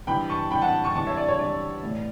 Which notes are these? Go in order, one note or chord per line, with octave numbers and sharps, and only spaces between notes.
G2 E3 G5 B5
A5 C#6
G2 E3 G5 B5
F#5 A5
A5 C#6
G2 E3 A5 C#6
C#5 E5
D5
C#5
G2 E3 D5
A2 E3